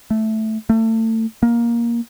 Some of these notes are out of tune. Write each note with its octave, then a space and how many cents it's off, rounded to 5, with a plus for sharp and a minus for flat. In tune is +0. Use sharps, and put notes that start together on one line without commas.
A3 -5
A3 +30
A#3 +10